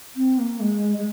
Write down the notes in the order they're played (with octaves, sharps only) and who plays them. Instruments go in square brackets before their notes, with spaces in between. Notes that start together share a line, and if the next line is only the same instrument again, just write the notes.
[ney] C4
A#3
G#3
G#3